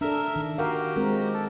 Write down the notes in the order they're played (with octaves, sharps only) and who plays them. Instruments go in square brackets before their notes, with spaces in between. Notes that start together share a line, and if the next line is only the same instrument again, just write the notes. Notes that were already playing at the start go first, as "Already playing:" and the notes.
[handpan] D4 A4 [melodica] A#4 E5
[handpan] D#3
[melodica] F#4 G4 [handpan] A#4 F5
[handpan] G#3 C4 A#4
[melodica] A4